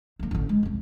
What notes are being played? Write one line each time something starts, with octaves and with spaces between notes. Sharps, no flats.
D3 A#3
A1 D3
G#3
C2 F2